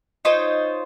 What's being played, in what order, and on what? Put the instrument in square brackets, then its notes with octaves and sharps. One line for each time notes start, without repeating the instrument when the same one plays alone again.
[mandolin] D#4 F4 C5 C#5